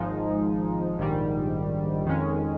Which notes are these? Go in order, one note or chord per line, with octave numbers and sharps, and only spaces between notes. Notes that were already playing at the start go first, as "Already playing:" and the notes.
Already playing: G#1 G#2 F3 G#3 D#4
A#1 G#2 D#3 G3
F2 D#3 G#3 C#4